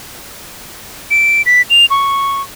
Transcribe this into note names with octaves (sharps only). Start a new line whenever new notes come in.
D7
B6
F7
C#6